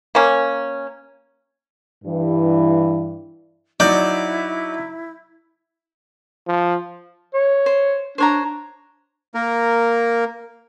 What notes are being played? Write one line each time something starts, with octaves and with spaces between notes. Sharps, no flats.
A#3 C#4
G2 E3
F#3 D#4 E4 D5 G6
F3
C#5
C5
D4 C5 C#5 A#5
A#3 A#4